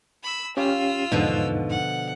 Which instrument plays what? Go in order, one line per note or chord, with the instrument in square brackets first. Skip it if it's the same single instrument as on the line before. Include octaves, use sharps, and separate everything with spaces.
[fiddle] B5 E6
[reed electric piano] C#4 G4 F5 [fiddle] F4 E6
[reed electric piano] E2 G#2 D#4 [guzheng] B2 D3 F3
[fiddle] F#5